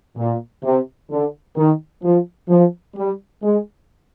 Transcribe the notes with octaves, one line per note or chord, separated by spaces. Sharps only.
A#2
C3
D3
D#3
F3
F3
G3
G#3